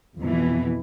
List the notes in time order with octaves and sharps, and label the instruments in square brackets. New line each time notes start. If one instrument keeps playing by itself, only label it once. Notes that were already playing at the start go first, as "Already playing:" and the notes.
[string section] F2 B2 E3